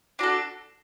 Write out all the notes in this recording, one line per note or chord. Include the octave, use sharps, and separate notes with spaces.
D4 F#4 A4